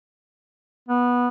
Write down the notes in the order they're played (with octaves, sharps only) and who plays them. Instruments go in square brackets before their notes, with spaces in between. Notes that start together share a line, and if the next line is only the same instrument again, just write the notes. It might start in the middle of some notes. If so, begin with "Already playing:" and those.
[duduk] B3